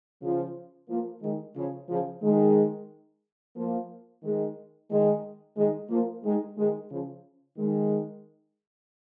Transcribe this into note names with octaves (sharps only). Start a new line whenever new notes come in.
C#3 F3
F3 A#3
D#3 G#3
C#3 F3
C#3 F3
D#3 G#3
F3 A#3
D#3 G#3
D#3 G#3
D#3 G#3
F3 A#3
D#3 G#3
D#3 G#3
C#3 F3
D#3 G#3